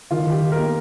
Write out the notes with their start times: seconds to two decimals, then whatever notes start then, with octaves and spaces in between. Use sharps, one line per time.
0.11 D#3 F4
0.27 D#3 G4
0.42 D#3
0.52 A#4
0.58 A#3